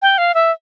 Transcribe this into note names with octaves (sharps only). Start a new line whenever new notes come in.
G5
F5
E5